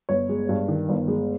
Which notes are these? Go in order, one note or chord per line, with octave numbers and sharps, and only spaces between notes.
G1 C#5
G#3
G2
D#3
G1
G#3